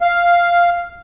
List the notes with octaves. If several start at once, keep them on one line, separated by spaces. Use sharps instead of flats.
F5